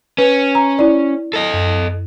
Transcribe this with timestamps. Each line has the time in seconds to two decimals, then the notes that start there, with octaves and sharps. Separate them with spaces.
0.18 C#4 B4
0.55 A#5
0.79 E4 D5
1.33 A4 D#5
1.54 F#2